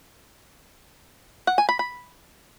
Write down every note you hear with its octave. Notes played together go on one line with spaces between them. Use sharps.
F#5
G#5
B5
B5